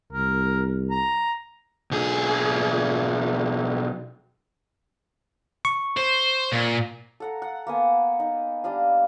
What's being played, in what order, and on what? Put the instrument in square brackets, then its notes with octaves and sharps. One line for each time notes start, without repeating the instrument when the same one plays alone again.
[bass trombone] C2 [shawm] A#4
[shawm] A#5
[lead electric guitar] B1 G#4
[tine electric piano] C#6
[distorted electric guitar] C5
A#2
[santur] A4 F#5 A#5
F#5
A#3 B3 G#5 A5
D#4
G3 D4 D#5 F5